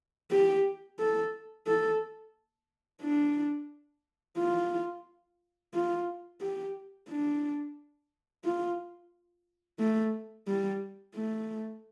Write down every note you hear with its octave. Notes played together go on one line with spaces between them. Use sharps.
G4
A4
A4
D4
F4
F4
G4
D4
F4
A3
G3
A3